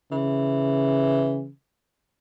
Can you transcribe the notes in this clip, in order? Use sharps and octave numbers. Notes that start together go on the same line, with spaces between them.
C#3 E3